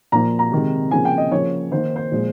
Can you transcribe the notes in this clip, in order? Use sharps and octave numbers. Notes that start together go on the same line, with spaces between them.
A#2 F3 A#3 A#5
A#5
C3 D#3 G#3
C#3 F3 A#3 G#5
G5
D#5
C#3 F3 A#3 C#5
D#3 A#3 C5
C5
A#2 F3 G#3